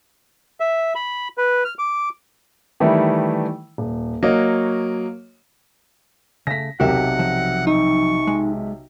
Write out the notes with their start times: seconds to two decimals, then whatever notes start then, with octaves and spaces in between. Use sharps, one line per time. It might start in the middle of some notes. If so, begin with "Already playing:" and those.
0.60 E5
0.95 B5
1.38 B4
1.65 F6
1.79 D6
2.80 D#3 E3 G3 A3 E4
3.78 D#1
4.23 F#3 A#3 F#4 C#5 D#5
6.47 C#3 A3 A#6 B6
6.80 B1 C3 F#4 G4 A#4 E5 F#5
7.19 F3 F#3
7.67 D#4 C#6
8.27 G#3